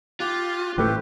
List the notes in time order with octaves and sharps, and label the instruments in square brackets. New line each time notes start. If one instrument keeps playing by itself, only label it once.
[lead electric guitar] F4 [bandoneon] G4 F#6
[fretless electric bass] A1 A2 A3 [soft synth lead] G4 [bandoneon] B4 C5